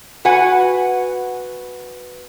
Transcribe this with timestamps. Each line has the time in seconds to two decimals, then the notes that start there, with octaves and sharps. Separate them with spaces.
0.25 F#4 B4 F#5 G#5